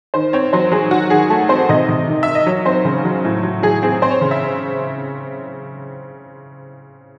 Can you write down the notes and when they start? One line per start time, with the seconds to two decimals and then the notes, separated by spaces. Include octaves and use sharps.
0.14 D#3 C5
0.33 C4 C#5
0.53 F#3 C5
0.72 F#3 G#4
0.91 D#3 F#4
1.10 D#3 G#4
1.30 A3 A4
1.49 C4 C5
1.69 C3 D#5
1.89 C3
2.08 D#3
2.23 D#3 E5
2.35 D#5
2.46 F#3 C#5
2.66 C4 C5
2.85 C#3
3.05 F#3
3.24 A2
3.43 F#3
3.62 F#3 G#4
3.83 C4 G#4
4.02 C4 C5
4.11 C#5
4.21 C#3
4.31 E5